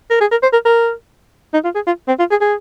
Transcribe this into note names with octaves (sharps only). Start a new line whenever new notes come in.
A#4
G#4
A#4
C5
A#4
A#4
D#4
F4
G#4
F4
C4
F4
G#4
G#4